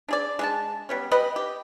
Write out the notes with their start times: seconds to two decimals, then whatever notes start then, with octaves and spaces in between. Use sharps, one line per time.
0.08 D4 G#4 D5
0.39 G#3 D4 A5
0.89 G3 B3 C#4
1.11 G3 G4 B4 D#5
1.36 G4